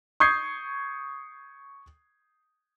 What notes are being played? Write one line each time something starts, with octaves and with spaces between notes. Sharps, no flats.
C#6 D#6 G6 G#6 C7